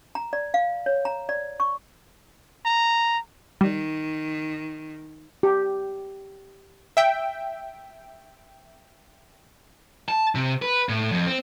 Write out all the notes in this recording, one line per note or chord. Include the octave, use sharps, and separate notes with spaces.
A#5
D5
F5
C#5
A#5
D5
C#6
A#5
D#3 G3
G4
E5 G5
A5
C3
B4
A2
F2
C4